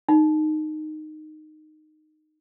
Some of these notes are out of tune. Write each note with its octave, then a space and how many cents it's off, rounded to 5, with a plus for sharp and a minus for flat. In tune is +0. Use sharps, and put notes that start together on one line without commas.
D#4 -15